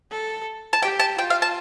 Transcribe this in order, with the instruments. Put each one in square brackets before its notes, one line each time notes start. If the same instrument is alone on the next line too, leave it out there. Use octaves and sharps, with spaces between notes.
[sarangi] A4
[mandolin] A5
[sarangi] G4 [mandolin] G5
[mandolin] A5
[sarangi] F4 [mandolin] G5
[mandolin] F5
A5